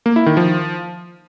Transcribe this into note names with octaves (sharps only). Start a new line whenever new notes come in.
A#3
E4
D#3
F3